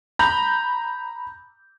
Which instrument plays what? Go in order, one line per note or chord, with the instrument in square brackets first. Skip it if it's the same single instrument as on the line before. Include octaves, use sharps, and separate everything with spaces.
[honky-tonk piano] A#5 B5 G6